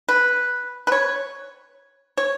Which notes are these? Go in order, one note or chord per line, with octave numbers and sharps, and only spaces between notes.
B4
B4
C#5
C#5